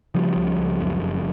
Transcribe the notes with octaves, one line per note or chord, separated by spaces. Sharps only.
C#3 F3 G3
C#2
C#2
F#2
F#1